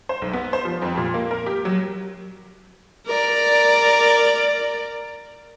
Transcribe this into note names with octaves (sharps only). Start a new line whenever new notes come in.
C5
B1
B3
C5
F3
F2
A#2
A#3
A#4
G4
F#3
A#4 D5